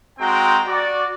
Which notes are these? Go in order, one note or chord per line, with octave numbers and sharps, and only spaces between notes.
G#3 C4 F#4 G5 A#5
F#4 D5